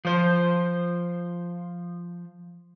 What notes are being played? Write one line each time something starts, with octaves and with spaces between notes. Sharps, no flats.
F3 C5